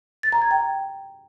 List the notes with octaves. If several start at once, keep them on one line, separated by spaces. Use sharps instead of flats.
A6
A#5
G#6
G5